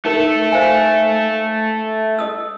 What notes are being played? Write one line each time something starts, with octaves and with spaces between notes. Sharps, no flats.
A3 D#4 A4 A#4
C5 F5 G#5
D#5 D#6 E6